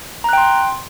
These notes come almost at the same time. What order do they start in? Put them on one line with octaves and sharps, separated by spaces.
A#5 F#6 G5 C6